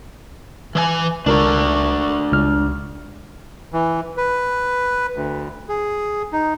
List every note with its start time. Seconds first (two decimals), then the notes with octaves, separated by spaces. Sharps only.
0.75 E3 D#5 G#5
1.26 C#2 D4 F#4 A#4
2.33 C#2 F6
3.72 E3
4.17 B4
5.16 D2
5.69 G#4
6.33 D#4